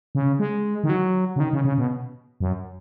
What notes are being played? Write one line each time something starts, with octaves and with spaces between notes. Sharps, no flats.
C#3
G#3
D#3
F#3
C#3
D#3
C#3
C#3
B2
F#2